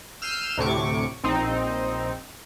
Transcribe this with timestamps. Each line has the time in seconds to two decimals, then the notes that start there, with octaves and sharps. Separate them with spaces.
0.22 E6 F6 G6 C7 D#7 E7
0.58 D2 A2 C3 C#6 D6
1.24 A#1 C4 D#4